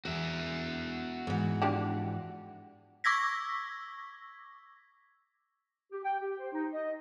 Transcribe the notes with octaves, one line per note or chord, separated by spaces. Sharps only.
E2 F#4 E5
G#2 E3
F3 D4 G4
C#6 D6 E6 G#6 A#6 B6
G4
G5
G4
C5
D#4
D#5